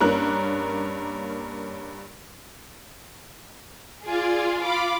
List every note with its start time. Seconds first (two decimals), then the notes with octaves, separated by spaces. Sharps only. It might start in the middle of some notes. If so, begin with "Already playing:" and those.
0.01 G2 A#3 C#4 A#4 F#6
4.05 F4 G#4 D5 G#5
4.62 F5 B5 D6